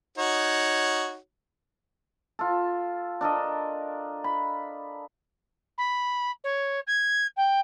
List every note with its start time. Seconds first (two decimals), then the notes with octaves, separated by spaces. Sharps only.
0.18 D#4 F#4 C#5
2.39 F4 A4
3.21 D4 A4 A#4 D#5
4.24 B5
5.78 B5
6.44 C#5
6.87 G#6
7.37 G5